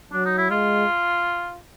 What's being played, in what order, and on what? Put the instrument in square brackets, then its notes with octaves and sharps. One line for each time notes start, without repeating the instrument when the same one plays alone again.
[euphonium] F#3 [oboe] D4
[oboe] D#4
E4
[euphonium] G#3 [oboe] F4